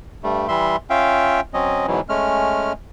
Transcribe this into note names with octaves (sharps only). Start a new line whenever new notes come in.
G2 G3 A3
E3 G3 E5 C6
C#4 F4 E5 F5 G5
F#3 C4 C#4 D#5
G#2 B2 E3 F#3
G#3 A3 C#4 F6